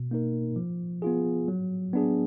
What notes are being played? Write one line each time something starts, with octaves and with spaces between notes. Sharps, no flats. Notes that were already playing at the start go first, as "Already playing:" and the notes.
Already playing: B2
A#3 D#4 A#4
F3
B3 F4 G#4
F#3
B3 D4 G#4